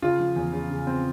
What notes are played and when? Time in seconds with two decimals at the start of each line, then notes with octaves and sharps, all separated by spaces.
0.02 C#3 F4
0.19 F3
0.36 E2
0.53 C#3
0.70 C#3
0.87 C4